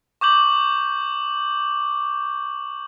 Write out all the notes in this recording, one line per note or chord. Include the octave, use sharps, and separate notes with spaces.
C#6 D6 G6 F#7